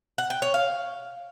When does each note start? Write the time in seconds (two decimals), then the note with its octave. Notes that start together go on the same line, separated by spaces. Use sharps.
0.18 F#5
0.30 G5
0.42 C#5
0.54 F5